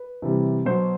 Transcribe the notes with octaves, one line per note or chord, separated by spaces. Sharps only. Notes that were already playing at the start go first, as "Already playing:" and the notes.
Already playing: B4
C3 E3 G3
B2 F#3 C5